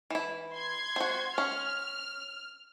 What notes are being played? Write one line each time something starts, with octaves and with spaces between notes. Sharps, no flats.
E3 E4
C6 G#6
C4 F#4
C#4 F6